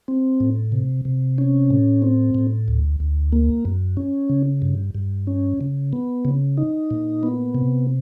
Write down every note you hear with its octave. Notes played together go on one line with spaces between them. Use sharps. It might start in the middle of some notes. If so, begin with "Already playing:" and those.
C4
A2
C3
C3
C#4
A2
C4
A2
D2
D2
A#3
F#2
C#4
C#3
G2
G2
C#4
C#3
B3
C#3
D#4
A#2
B3
C3